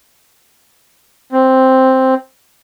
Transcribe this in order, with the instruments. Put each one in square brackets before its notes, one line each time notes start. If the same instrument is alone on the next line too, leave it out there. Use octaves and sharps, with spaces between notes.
[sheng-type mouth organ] C4